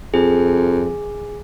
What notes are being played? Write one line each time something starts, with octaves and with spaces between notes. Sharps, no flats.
F2 G#4